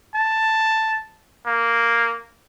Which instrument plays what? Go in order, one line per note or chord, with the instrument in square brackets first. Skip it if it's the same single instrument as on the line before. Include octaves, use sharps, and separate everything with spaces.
[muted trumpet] A5
A#3